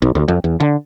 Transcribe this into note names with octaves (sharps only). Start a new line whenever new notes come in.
B1
D2
F2
E2
D3